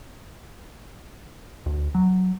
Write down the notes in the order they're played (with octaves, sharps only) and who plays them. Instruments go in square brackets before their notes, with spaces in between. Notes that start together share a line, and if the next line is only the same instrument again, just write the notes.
[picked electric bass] D2
F#3